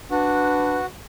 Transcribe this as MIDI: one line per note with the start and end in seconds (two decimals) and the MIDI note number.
0.11 0.79 62
0.11 0.86 66
0.11 0.76 71